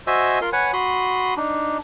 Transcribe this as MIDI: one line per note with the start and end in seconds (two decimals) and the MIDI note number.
0.07 0.39 66
0.07 0.39 72
0.07 0.39 75
0.07 0.39 76
0.07 0.39 80
0.07 0.39 88
0.41 0.50 65
0.41 0.50 70
0.41 0.50 84
0.53 0.71 71
0.53 0.71 73
0.53 0.71 78
0.53 0.71 80
0.73 1.34 66
0.73 1.34 83
0.73 1.34 84
0.73 1.34 87
1.37 1.78 62
1.37 1.78 63